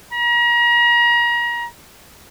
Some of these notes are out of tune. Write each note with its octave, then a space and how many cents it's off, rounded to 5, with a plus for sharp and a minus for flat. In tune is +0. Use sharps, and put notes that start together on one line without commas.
A#5 +35